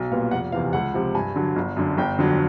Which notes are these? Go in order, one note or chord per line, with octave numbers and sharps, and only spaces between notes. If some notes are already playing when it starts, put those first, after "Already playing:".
Already playing: B1
A#2 G3 B3 F5
F1 F#5
E2 C3 E3 F5
C#2 F#5
C3 F3
G2 G#5
D3 F#3
G1
F#2 D3
G1 G5
F2 D3 F#3